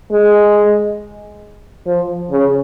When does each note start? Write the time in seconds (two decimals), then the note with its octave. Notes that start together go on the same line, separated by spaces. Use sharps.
0.11 G#3
1.86 F3
2.31 C#3